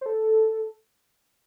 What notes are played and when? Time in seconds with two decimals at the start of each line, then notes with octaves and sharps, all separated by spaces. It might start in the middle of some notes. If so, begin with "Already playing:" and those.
0.01 C5
0.06 A4